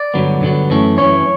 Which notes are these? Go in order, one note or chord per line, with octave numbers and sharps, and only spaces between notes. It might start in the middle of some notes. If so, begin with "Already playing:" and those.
Already playing: D5
G2 D3 F#3 B3
G2 D3 F#3 B3
F#2 E3 A3 C#4
F#2 E3 A3 C#4 C#5